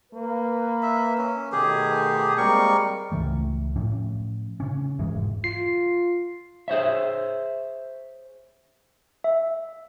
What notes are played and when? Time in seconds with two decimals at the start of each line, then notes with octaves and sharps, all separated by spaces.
0.13 A#3 B4
0.83 E5
1.18 C#4
1.52 B2 D#3 A3 G4 G#4
2.38 G3 G#3 A#3 C4 A#4 C#6
3.12 C#2 C#3 E3 A3
3.76 A2 F3 C#4
4.60 C#3 C#4
4.99 E1 G#2 E3 G#3
5.44 F4 C7
6.68 G#4 C5 C#5 E5
9.24 E5